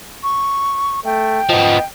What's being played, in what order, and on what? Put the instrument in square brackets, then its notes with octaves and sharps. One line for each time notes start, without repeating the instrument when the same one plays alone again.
[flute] C#6
[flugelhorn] A3 [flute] G5
[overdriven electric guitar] F3 B3 [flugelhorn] D#5